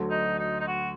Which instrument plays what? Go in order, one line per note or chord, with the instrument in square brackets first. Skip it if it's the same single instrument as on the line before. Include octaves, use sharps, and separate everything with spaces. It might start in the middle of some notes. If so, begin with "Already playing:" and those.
Already playing: [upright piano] D2 D3 F#3 A3
[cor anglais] D#4
D#4
D#4
F#4